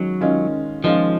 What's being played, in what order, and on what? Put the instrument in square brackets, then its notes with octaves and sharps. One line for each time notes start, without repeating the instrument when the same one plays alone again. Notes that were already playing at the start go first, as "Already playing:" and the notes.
Already playing: [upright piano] D#3 G#3 C#4 [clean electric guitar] F#3
[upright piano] D#3 G#3 C#4 F4
[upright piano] D#3 G#3 C#4 F4 [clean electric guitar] F3